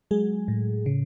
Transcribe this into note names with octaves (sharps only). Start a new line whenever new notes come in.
F#3 G#3 G#4
A2
C#3